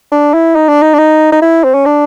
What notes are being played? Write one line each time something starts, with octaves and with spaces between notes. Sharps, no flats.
D4
E4
D#4
D4
D#4
D4
D#4
D#4
E4
C4
C#4
D4